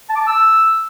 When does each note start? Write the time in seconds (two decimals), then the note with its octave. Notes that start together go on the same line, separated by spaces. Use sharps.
0.10 A5
0.16 D6
0.21 A5
0.27 E6